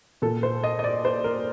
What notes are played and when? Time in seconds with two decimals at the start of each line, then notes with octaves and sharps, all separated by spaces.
0.22 A#2 A4
0.43 C5
0.64 D#5
0.79 D#5
0.84 D5
1.05 C5
1.24 A#4